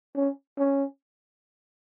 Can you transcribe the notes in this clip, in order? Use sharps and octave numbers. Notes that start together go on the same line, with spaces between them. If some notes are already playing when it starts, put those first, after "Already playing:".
C#4
C#4